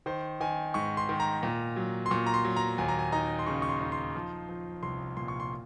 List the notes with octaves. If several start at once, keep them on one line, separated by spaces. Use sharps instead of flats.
D#3 C5
D#3 G#5
G#2 C#6
C6
D#3
A#5
A#2
F#3
C6
A#2 C#6
A#5
C6
F#3
A#5
D#2 G#5
A#5
G#5
D#4 A#5
C6
C#3 C#6
C#6
C6
D#4
C6
F3
F3
C2 C6
A#2 C6
C#6
C6